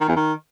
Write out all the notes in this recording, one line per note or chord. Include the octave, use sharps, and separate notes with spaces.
D#3
E2
D#3